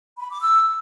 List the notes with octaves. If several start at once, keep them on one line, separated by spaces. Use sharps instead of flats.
B5
D6
E6